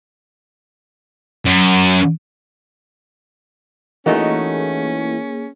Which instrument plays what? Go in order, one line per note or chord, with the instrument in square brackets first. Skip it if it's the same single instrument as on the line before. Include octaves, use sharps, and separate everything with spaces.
[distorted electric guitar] F#2
[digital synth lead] E3 [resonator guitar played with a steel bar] A3 D#4 F#4 [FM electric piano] A#3 G#4 [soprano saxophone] C#4